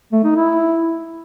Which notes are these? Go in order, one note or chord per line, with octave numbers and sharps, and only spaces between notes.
A3
D#4
E4